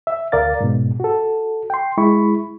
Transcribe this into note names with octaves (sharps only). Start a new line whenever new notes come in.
E5
D2 A#4 D5 F5 A6
G#2 B2
F#4 A4
G5 C6
G#3 E4 B5 C#6